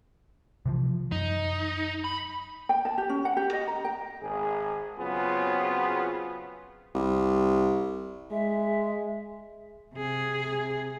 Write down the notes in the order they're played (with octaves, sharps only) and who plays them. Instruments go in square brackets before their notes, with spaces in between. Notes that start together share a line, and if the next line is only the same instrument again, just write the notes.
[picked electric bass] C3 E3 F3
[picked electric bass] F#2 [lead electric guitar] D#4
[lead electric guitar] B5
[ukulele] G5
A5
G4
C#4
F#5
G4
D#5
A#5
G5
[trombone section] G#1 G#4
C#3 F#3 B3 C4 F4 G#4
[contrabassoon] C2
[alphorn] G#3 [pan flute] E5
[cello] C3 G#4